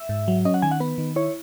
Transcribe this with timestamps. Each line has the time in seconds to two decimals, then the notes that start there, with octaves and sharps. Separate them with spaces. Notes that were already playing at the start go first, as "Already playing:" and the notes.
Already playing: E5
0.09 G#2
0.28 F#3
0.45 C#4 D#5
0.54 F#5
0.62 D#3 G#5
0.71 F#5
0.80 B3 B4
0.98 D#3
1.16 E4 C#5